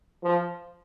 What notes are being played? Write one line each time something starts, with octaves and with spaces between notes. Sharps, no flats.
F3